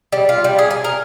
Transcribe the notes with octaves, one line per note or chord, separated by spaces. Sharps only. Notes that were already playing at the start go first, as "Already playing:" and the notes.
G3
F4
G3
G#4
G#5
A#4